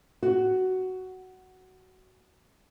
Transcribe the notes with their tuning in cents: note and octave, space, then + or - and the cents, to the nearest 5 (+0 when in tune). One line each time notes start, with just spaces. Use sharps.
F#4 +10